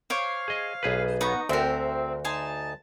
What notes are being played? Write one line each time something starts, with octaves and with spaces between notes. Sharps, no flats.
C5 C#5 F5 D6
G#4 D#5
B1 G#4 B4
B3 D#4 A#5 C#6
D2 C4 F#4 A#4 E5
D#4 G#5 A5 C6